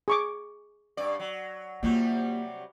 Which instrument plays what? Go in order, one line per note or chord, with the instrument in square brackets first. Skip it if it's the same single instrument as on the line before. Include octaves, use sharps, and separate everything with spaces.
[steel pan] G#4 C#6 D6
[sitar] G2 D5
F#3
[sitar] C3 F#3 G3 [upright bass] A#3 F4